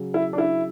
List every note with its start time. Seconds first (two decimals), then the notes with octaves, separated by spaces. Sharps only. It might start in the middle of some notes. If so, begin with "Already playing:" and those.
Already playing: C#3 F#3
0.14 E4
0.33 D4
0.38 E4